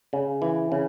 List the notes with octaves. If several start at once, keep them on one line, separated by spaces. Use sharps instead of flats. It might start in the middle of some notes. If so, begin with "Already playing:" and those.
C#3
E3
C#3